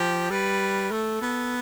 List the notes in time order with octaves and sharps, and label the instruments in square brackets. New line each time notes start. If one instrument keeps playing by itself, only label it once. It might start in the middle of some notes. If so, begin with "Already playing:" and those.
Already playing: [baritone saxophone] F3 [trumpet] G4
[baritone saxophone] G3 [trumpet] B4
[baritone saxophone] A3 [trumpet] A4
[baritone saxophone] B3